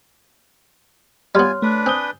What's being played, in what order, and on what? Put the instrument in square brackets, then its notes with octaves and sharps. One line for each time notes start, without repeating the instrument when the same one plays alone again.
[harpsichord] G3 B3 [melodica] F4 G#5 [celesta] C#5 C6 F6
[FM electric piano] A3 [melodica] D4 B4
[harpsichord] C4 [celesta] G#5 G7 [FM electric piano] D#6 G6